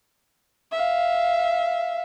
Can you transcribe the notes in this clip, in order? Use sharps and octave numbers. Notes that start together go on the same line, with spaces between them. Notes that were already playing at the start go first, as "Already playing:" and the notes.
E5 F5